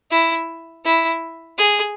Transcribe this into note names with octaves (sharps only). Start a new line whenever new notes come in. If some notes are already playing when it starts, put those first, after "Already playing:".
E4
E4
G#4